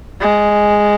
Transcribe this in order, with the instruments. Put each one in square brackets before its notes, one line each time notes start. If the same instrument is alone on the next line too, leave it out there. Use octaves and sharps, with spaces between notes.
[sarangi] G#3